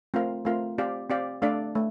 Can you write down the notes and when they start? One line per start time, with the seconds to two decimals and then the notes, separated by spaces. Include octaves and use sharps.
0.14 A3 C4 F4 A#4 F5
0.45 A3 C4 F4 A#4 F5
0.78 C4 G4 D5 F5
1.10 C4 G4 D5 F5
1.42 A3 D4 A4 D5 F5
1.75 A3